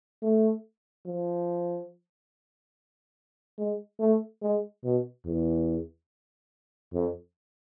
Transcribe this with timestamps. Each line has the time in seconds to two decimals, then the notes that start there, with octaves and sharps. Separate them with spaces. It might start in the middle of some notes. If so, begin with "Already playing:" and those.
0.23 A3
1.06 F3
3.58 G#3
4.00 A3
4.42 G#3
4.84 B2
5.26 E2
6.93 F2